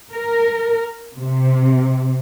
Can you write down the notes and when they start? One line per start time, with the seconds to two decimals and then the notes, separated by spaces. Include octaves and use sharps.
0.13 A#4
1.18 C3